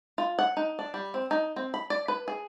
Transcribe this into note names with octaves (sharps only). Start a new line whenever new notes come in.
F4
F#5
D#4
D4
G3
C4
D#4
C4
B5
D5
B4
G#4